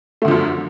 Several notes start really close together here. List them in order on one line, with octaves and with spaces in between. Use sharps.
A3 D3 F3 F#2